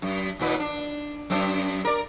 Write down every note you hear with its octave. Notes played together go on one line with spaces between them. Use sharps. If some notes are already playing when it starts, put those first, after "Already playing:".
F#2
D#2 A#2 B4
D4
F#2 C4 D4
A#4 D5